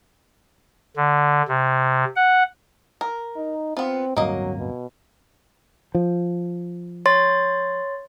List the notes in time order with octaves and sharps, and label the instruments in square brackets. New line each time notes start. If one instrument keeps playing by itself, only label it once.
[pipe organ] D3
C3
F#5
[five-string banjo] A#4
[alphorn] D#4
[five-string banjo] B3 F4 [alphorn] C4
[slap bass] D1 G2 C4 [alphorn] F#3 [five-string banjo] A#3 D#5
[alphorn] B2
[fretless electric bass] F3
[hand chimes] C#5 C6 A6